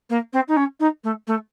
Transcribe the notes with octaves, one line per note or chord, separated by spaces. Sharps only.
A#3
C4
D#4
C#4
D#4
A3
A3